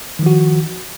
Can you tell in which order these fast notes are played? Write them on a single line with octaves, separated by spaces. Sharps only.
D#3 F3 F#4